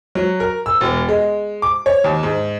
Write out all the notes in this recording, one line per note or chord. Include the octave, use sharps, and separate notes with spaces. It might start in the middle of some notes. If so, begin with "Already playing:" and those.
F#3
A#4
E6
E1
G#3
D6
C#5
D#2
G#2